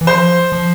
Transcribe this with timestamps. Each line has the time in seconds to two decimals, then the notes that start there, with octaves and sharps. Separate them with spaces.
0.01 E3
0.07 F3 C5
0.52 F3